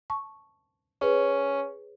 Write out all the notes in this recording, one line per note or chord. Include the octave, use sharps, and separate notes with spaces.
A5 C#6
C#4 G#4 B4 C#5